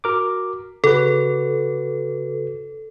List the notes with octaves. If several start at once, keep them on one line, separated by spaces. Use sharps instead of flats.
F#4 A#4 D6
C#3 F#4 A4 B4